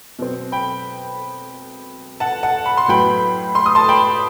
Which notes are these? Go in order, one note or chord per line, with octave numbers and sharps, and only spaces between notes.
B2 F#3 C4
G5 B5
F#5 A5
F#5 A5
B5
C6
A2 F#3 B3 G5 B5
C6
D#6
A5 C6
G5 B5